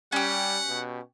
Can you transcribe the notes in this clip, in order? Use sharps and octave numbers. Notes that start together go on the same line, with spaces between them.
G3 C#4 G4 F#5
B2